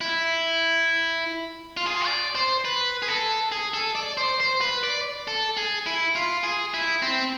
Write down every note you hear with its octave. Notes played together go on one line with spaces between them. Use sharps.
E4
F4
G#4
F4
D5
C5
B4
G#4
A4
G#4
A4
D5
C5
C5
B4
D5
A4
G#4
E4
F4
G#4
E4
C4